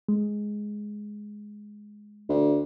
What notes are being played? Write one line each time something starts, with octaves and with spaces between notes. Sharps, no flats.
G#3
D2